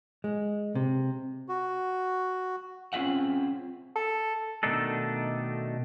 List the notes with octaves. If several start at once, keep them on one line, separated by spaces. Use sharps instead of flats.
G#3
C3
F#4
C4 C#4 F4 G#4 E5 F#5
A4
B2 D#3 A3 D4 D#4 A4